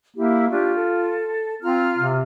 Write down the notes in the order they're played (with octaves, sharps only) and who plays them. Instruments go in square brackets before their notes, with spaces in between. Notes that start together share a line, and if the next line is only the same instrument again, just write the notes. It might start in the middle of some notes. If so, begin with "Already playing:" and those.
[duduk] A#3 [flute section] E4 G4
[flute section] D4 G4 C#6 [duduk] F4
[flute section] A4
[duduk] C4 [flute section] F4 A#5 F6
[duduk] C3